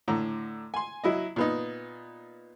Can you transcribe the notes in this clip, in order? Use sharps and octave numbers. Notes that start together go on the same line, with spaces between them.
A2 D3 A#5
G#5 C6
F#3 E4 D#5
A#2 B3 D#4